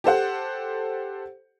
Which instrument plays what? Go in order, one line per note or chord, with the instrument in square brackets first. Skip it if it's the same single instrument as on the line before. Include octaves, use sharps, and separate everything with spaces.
[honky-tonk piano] G4 A4 C5 F#5